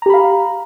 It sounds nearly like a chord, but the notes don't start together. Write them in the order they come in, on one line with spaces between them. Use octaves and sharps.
A#5 G4 B5 F5